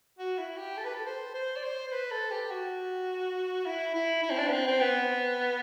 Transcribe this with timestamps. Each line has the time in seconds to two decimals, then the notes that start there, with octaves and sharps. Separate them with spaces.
0.19 F#4
0.38 E4
0.58 G4
0.77 A4
0.85 B4
0.94 A4
1.06 C5
1.35 C5
1.57 D5
1.64 C5
1.88 C5
1.92 B4
2.11 A4
2.31 G4
2.51 F#4
3.66 E4
3.95 E4
4.23 E4
4.30 C4
4.38 D4
4.47 B3
4.52 C4
4.67 C4
4.81 B3